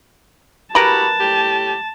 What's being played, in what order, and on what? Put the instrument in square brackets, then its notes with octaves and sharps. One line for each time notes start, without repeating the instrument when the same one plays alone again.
[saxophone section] E4 F#4 G4 [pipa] A#4 B4 [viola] A5
[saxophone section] A2 G4